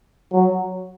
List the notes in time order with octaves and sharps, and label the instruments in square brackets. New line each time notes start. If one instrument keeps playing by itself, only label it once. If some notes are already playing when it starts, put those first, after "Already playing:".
[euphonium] F#3